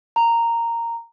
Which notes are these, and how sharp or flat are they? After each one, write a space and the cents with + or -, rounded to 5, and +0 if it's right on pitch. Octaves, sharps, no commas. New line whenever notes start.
A#5 -10